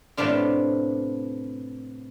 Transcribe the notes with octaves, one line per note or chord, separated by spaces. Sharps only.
A2 C3 B3 D4 F4